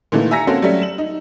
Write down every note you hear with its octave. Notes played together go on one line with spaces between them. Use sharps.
A#2 D#3 E3 A3 A#3
E5 G#5 A#5 E6 A#6 C#7
A#3 C4 C#4 F#4 A4 C#5
F#3 G3 A3 C#4 E5
E7 F#7
D#4